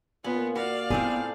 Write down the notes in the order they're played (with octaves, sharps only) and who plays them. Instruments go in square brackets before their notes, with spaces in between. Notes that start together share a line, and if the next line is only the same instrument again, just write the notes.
[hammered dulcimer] A#2 [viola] B3 F4 [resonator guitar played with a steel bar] C#4
[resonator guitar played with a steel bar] F#4 [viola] D5 F5
[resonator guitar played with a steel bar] A2 C4 G#4 [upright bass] B3 [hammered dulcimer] A4